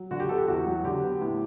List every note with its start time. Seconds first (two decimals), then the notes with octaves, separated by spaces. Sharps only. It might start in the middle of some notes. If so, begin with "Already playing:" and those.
Already playing: F#3
0.11 D3 F#4
0.20 G4
0.29 B3 A4
0.38 G4
0.48 E2 F#4
0.66 F#3
0.84 D3 G4
1.03 B3
1.21 A2